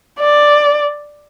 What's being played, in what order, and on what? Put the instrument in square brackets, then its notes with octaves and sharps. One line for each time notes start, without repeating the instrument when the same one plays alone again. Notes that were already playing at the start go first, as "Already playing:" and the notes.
[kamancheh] D5